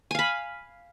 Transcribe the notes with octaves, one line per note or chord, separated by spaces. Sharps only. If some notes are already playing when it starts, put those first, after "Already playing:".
F5 G#5 B5